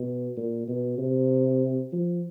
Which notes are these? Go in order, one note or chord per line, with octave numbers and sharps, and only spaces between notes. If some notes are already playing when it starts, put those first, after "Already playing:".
Already playing: B2
A#2
B2
C3
F3